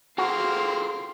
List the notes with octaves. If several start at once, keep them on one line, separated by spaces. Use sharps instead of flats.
A#3 C4 F4 F#4 G#4 A4 F5 C6